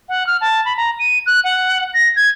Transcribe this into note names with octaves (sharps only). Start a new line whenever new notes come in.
F#5
F6
A5
B5
A#5
D#7
F#6
F#5
A#6
G#6